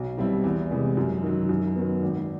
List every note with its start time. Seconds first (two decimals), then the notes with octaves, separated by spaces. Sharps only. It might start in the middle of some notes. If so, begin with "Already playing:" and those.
Already playing: B1
0.18 B2 G3 C4 E4
0.44 E2
0.71 C3 E3 G#3
0.97 F#2
1.23 D#3 F#3
1.49 F#2
1.76 D#3 F#3 B3
2.02 G#1